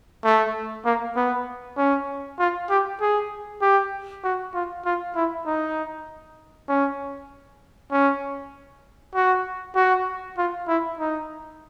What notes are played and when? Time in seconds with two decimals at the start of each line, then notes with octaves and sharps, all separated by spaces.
0.24 A3
0.85 A#3
1.16 B3
1.78 C#4
2.39 F4
2.70 G4
3.01 G#4
3.62 G4
4.24 F#4
4.54 F4
4.85 F4
5.16 E4
5.46 D#4
6.69 C#4
7.91 C#4
9.15 F#4
9.76 F#4
10.38 F4
10.68 E4
10.99 D#4